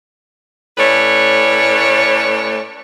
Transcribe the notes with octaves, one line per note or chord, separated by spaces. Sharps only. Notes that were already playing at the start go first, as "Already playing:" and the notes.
A2 A3 C#4 B4 C#5 D5